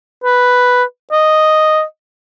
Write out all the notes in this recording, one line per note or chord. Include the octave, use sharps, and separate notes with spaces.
B4
D#5